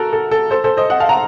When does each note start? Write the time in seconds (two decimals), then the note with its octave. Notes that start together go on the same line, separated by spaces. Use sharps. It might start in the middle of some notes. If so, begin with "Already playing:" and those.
Already playing: F#4 A4 A#4
0.13 A4
0.31 A4
0.50 A4 C5
0.64 A4 C5
0.77 C5 D#5
0.90 D#5 F#5
1.00 F5 A5
1.09 F#5 A#5